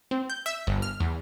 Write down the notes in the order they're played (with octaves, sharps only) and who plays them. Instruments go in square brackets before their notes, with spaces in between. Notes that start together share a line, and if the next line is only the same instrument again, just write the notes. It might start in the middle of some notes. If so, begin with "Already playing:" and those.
[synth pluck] C4
G6
E5
G1
F6
E2